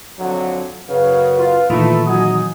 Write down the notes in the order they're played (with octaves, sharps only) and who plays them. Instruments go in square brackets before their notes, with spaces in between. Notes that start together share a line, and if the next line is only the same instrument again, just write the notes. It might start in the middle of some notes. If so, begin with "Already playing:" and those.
[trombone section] F2 D3 F#3
[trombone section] F#2 C#3 [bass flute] B4 [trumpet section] C#5 F5
[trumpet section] F4
[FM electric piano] A#2 D#3 E3 [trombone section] A3 [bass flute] F4 [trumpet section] B4 B5
[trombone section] G#1 D#4 F#4 [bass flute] F#3 [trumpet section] G#5 D#6